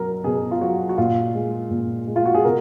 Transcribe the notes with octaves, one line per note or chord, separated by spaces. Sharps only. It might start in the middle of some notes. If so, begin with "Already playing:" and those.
Already playing: B2 F#3 A#4
B2 G#4
F4
F#3 F#4
F#4
A#2 F4
G#3
A#2
G#3
F4
F#4
G#4
B2 A#4